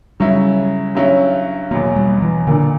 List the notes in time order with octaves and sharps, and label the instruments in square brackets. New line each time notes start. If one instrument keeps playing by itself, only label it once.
[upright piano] C#3 F#3 C#4 E4 [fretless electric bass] G3
[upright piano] G2 F#3 C#4 E4
[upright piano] E2 B2 F#3 [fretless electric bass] A#3
[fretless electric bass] G3
E3
[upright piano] A#2 A#3 D4 [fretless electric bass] D3